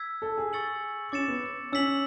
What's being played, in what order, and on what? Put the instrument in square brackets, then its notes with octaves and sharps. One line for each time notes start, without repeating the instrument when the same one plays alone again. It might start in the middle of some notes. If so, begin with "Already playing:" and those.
Already playing: [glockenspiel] E6 G#6 B6
[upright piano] A4
G#4
[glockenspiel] C#6 E6 A6 C#7 F#7
[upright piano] C#4 [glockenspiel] D6 A6 C#7 E7
[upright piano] B3
[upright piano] C#4 [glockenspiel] E6 B6 F#7